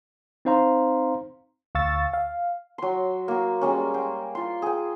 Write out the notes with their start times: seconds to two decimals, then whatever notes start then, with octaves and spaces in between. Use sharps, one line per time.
0.45 C4 D#4 C5 F5 A#5 C6
1.75 D2 F5 C#6 E6 A6
2.13 F5
2.78 F#3 C6
3.28 A#3 F#4
3.61 G3 G#3 A#3 C#4
3.94 G5 C6
4.35 F4 C6
4.62 G#4 G5